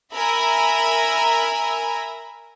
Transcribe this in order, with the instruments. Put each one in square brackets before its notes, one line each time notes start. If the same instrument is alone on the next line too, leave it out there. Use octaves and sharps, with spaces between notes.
[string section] A#4 E5 G#5 A#5 B5